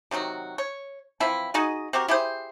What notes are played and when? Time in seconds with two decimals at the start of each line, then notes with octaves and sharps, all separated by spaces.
0.11 C3 D#3 F#3 F#4
0.58 C#5
1.20 E3 F3 C4 E4
1.54 D#4 F#4 G#4 D#5
1.93 C4 F#4 G4 A#4
2.08 E4 G4 G#4 C5